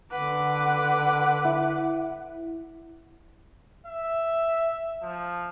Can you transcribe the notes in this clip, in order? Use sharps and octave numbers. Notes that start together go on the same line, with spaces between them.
D3 B4 F#5 D6
E4
E5
F3